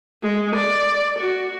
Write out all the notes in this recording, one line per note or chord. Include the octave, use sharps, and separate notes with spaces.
G#3
D5
F#4